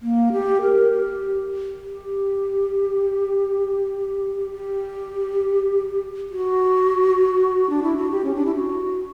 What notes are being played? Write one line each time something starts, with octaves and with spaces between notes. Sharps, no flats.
A#3
G4
A#4
G4
G4
G4
F#4
D4
E4
F#4
G4
C#4
D4
E4
F#4